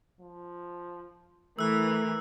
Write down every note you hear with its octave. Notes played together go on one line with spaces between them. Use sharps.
F3
E3 A3 A#4 E6 F#6